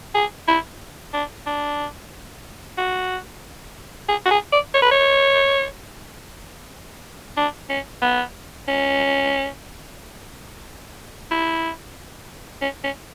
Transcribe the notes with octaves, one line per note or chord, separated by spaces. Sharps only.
G#4
E4
D4
D4
F#4
G#4
F#4
G#4
D5
C#5
B4
C#5
D4
C#4
B3
C#4
E4
C#4
C#4